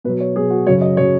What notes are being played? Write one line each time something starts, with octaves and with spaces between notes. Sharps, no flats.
B2 F#3 B4
C#5
B2 F#3 G#4
F#4
F#2 C#3 F#3 C#5
D#5
C#3 F#3 C#5